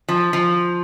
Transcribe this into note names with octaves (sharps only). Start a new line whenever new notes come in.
F3
F3